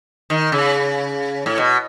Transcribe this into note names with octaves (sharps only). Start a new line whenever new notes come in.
D#3
C#3
A2
B2